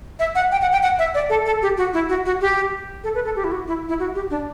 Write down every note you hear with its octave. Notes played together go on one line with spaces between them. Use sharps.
E5
F#5
G5
F#5
G5
F#5
E5
D5
A4
A4
G4
F#4
E4
F#4
F#4
G4
A4
B4
A4
G4
E4
F#4
E4
E4
F#4
G4
D4